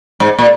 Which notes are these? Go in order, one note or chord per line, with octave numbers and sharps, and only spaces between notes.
G#2
A#2